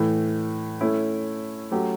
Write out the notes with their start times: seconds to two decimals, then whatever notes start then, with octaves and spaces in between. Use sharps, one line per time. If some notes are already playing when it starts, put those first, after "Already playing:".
Already playing: A2 E3 A3
0.81 A3 C#4 E4
1.71 F#3 A3 C#4 G4